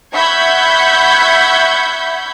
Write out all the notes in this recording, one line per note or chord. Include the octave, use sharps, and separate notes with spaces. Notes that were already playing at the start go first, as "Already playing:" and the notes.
E5 F#5 B5 C#6 G6 G#6